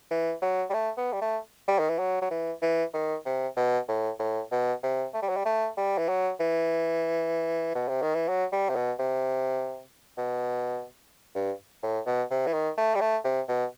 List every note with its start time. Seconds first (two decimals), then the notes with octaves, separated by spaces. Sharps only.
0.10 E3
0.42 F#3
0.69 G3
0.73 A3
0.97 B3
1.13 G3
1.21 A3
1.68 G3
1.79 D#3
1.89 E3
1.99 F#3
2.21 F#3
2.30 E3
2.62 E3
2.93 D#3
3.25 C3
3.56 B2
3.88 A2
4.19 A2
4.51 B2
4.83 C3
5.14 A3
5.22 G3
5.29 F#3
5.37 G3
5.45 A3
5.77 G3
5.98 E3
6.08 F#3
6.40 E3
7.75 B2
7.88 C3
8.02 D#3
8.15 E3
8.28 F#3
8.52 G3
8.69 C3
8.75 B2
8.99 C3
10.18 B2
11.35 G2
11.83 A2
12.06 B2
12.30 C3
12.47 E3
12.53 D#3
12.77 A3
12.95 G3
13.00 A3
13.24 C3
13.48 B2